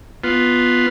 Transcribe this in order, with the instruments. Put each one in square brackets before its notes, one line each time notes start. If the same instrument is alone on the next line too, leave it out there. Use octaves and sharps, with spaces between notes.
[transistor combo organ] B3 F4